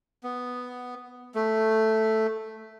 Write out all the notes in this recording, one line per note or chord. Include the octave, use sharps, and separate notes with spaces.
B3
A3